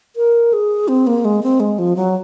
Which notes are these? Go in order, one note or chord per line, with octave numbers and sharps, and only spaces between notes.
A#4
G#4
C4
A#3
G#3
C4
G#3
F3
F#3